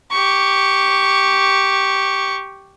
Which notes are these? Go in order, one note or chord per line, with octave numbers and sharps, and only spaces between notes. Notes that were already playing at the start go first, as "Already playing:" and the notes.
G4 C#6